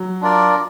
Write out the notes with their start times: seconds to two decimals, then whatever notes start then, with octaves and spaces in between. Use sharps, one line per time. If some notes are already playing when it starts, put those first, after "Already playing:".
Already playing: F#3
0.21 D4 F4 A#4 D5